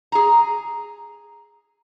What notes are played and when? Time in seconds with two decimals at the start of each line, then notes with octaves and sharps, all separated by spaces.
0.12 G#4 A#5